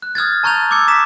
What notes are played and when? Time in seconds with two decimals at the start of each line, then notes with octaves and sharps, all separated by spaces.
0.02 F#6
0.15 D#6 F6 G#6 A6
0.43 A5 A#5 C#6 G6 A6 F7
0.71 D6 E6 G#6 C#7
0.88 A#5 D6 D#6 B6 C#7 E7